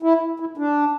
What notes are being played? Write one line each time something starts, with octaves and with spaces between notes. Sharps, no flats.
E4
E4
D4